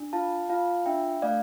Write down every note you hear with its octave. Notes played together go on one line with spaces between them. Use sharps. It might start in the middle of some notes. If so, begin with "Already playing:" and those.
Already playing: D4
F4 F5 A5
F4 F5 A5
D4 E5 G5
A3 D5 F5